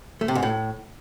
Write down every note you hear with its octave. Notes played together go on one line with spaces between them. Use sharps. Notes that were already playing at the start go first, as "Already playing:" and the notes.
A3
C3
G#2
A2